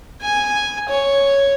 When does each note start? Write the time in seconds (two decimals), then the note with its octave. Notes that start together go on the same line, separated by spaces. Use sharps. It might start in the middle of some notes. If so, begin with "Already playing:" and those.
0.22 G#5
0.89 C#5